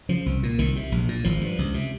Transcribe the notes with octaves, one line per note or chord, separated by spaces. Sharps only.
C#3 F3
C2
A#2
C2 D#3
C3
A#1
A#2
G#1 F3
G2
C#2
C3